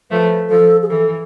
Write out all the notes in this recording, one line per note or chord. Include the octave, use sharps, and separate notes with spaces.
F3 A3 B4
F3 A4
G#4
E3 A4